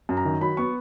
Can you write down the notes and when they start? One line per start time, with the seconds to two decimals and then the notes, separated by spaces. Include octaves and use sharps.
0.09 F#2
0.17 A#5
0.25 D#3
0.41 F#3 B5
0.57 B3 C#6